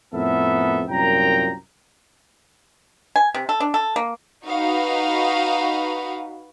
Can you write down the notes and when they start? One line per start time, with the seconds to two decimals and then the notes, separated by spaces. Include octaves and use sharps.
0.14 F2 A2 B3 A4 A#4 E5
0.89 C2 F#2 A#2 G5 A#5
3.16 G#5
3.34 C3
3.49 A4
3.60 D4
3.74 A4
3.96 A#3
4.47 D#4 F#4 B4 F5